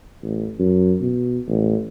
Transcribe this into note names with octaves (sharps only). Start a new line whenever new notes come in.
A1
F#2
B2
A1